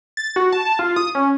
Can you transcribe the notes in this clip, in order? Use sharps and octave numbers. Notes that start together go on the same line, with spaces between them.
A6
F#4
A5
A5
F4
D#6
C#4